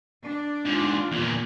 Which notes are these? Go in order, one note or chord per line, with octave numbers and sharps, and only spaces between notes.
D4
G#2 D3 F4
E2 A#2